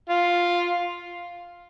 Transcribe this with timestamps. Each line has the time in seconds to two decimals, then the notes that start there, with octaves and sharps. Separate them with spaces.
0.09 F4